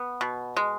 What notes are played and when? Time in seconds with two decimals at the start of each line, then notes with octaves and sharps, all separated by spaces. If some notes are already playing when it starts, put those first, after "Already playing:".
Already playing: B3
0.21 B2
0.57 G#3